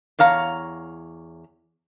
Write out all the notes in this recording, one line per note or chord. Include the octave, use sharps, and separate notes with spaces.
E2 C#5 F5 A#5